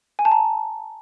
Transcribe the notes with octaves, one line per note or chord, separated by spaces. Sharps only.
G#5
A5
A#5